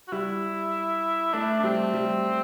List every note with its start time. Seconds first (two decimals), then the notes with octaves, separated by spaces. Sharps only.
0.08 F#4
0.12 G3 E4
1.33 A3 D4
1.59 D4
1.63 G3 C4
1.94 G3